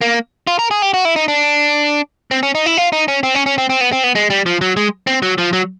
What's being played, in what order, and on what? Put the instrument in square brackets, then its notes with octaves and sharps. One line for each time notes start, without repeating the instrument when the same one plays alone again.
[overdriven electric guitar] A#3
F4
A#4
G#4
G4
F#4
E4
D#4
D4
C4
C#4
D#4
E4
F4
D#4
C#4
C4
C#4
C#4
C4
C4
B3
C4
B3
G#3
G3
F3
F#3
G#3
C4
F#3
F3
F#3